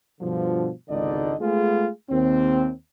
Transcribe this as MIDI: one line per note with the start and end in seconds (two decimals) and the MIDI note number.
0.20 0.69 43
0.20 0.69 47
0.20 0.69 50
0.20 0.69 53
0.89 1.34 32
0.89 1.34 37
0.89 1.34 50
0.89 1.34 63
0.89 1.34 74
0.89 1.34 75
1.40 1.87 56
1.40 1.87 57
1.40 1.87 59
1.40 1.87 65
1.40 1.87 68
2.09 2.70 39
2.09 2.70 60